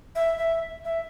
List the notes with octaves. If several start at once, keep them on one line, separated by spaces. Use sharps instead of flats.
E5
E5
E5